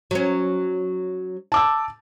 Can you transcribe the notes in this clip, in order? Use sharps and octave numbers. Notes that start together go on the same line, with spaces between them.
F#3 C#4
A5 D6 E6